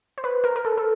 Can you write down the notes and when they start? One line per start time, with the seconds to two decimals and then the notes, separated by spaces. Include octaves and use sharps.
0.18 C5
0.24 B4
0.44 A#4
0.56 A#4
0.65 A4
0.78 A4